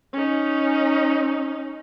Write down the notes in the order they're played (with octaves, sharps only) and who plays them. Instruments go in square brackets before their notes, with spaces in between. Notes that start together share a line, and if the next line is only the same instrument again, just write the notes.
[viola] C#4 D#4